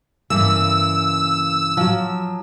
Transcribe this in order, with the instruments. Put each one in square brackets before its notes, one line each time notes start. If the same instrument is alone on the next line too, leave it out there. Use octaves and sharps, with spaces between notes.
[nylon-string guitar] G2 C#3 E3 [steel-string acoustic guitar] A#3 [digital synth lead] E6
[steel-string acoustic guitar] F3 F#3